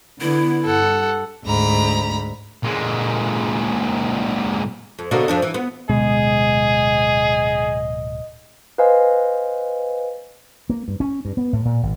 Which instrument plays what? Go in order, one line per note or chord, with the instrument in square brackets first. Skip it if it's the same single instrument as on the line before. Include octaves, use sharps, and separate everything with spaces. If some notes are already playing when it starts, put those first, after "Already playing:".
[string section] D3 B3 [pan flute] E4
[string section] G2 [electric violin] A4 F#5
[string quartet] D2 G#2 A#5 B5
[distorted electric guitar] A#2 G#3
[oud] F2
B2 D3 A#3
F2 F3 D4
E3
B3
[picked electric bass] D1 B2 G#3 [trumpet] G#4 [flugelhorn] D#5
[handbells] B4 C5 D#5 F5 G#5
[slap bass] A#3
G2
C#4
G2
B3
A2
A#2
G#1